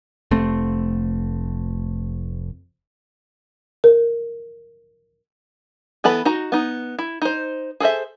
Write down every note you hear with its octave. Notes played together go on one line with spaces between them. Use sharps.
F1 A3 C4
A#4
E3 B3 A4 B5
D#4 F#4 A#5
B3 D#4
E4
D#4 C5
G#4 A4 C5 E5